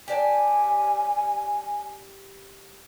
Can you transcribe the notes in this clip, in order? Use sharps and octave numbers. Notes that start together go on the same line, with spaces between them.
G4 D5 G#5 A5